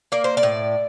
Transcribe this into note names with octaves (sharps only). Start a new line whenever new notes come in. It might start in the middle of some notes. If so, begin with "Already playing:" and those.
A#3 D5
C5
D5
A2